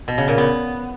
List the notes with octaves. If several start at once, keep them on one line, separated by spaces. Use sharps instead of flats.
B2
C#3
A#2
B3